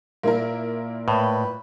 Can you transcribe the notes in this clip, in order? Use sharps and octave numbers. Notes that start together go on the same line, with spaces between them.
A#2 A#3 E4 F4 A#4
A2 B4